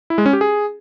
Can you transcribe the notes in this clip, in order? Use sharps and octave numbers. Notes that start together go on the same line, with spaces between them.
E4
G#3
C#4
G4
G#4